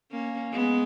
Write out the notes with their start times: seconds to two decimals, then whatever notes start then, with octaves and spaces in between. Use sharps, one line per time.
0.11 A#3 C#4
0.53 G#3 B3